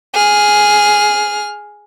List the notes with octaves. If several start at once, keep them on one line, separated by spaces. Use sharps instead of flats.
G#4 F6